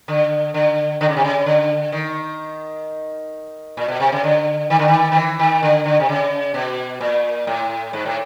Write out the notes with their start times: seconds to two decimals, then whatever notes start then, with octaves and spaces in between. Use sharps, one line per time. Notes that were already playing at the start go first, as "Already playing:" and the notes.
0.08 D3
0.54 D3
1.01 D3
1.08 C#3
1.16 C3
1.24 C#3
1.46 D3
1.92 D#3
3.77 A#2
3.88 B2
4.00 C3
4.12 C#3
4.24 D3
4.70 D#3
4.79 D3
4.88 D#3
5.12 D#3
5.16 E3
5.39 D#3
5.63 D3
5.85 D3
6.00 C3
6.09 C#3
6.54 B2
7.01 A#2
7.47 A2
7.93 G#2
8.06 A2